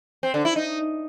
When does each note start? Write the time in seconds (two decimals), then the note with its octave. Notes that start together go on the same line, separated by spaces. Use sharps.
0.23 C4
0.34 D3
0.45 E4
0.56 D#4